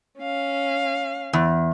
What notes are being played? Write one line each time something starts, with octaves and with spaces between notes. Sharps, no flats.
C#4 F5
E2